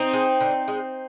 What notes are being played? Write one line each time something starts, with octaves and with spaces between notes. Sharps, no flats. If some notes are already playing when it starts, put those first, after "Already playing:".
Already playing: C4 D#4
G#3
D3
G#3